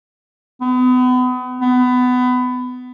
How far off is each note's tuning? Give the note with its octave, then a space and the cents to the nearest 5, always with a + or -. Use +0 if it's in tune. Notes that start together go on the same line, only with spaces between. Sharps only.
B3 +35
B3 +20